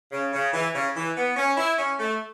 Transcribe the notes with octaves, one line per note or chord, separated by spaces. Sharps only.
C#3
C#3
E3
C#3
E3
B3
C#4
E4
C#4
A3